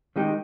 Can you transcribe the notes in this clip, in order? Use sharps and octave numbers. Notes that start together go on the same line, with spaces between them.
D#3 G#3 D#4 G4